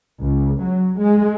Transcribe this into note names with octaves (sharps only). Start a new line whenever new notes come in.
C#2
F#3
G#3